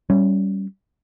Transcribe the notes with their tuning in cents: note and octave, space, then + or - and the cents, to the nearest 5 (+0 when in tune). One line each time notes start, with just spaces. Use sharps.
G3 -15 C#4 +0